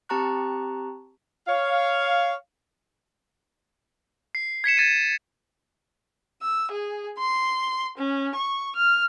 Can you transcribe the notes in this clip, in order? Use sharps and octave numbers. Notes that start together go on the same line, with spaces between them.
C4 G4 A5 A#5 C#6 F#6
C#5 F5
C7
G#6 B6 C#7 E7
G#6 A6 D#7
E6
G#4
C6
C#4
C#6
F6